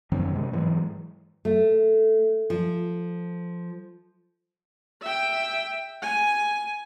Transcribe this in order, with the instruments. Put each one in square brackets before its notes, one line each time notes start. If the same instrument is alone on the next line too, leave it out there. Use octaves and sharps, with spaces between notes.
[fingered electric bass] F#2 D#3 F#3 C#4
C3 G#3
G#2 E3 F#3 G#3
[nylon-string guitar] A3
F3
[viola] E5 G5
G#5